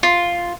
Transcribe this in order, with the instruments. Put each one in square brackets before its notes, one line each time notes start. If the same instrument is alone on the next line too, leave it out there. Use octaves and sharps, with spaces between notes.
[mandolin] F4